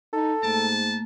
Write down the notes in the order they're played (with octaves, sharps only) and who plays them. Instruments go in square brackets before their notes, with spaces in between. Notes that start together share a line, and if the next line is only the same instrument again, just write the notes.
[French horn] D#4 [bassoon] A4
[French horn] G#2 [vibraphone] A3 A#3 [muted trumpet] A5